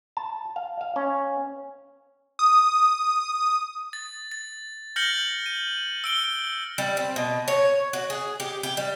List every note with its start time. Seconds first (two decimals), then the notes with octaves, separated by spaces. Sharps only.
0.17 A5
0.56 F5
0.81 F5
0.96 C#4
2.39 D#6
3.93 A6
4.32 A6
4.96 F6 G6 A#6 C#7 F#7
5.46 D#7
6.04 E6 D7 G7
6.78 G3
6.97 C4
7.16 B2
7.48 C#5
7.93 F#4
8.10 G#4
8.40 G4
8.63 G4
8.77 G3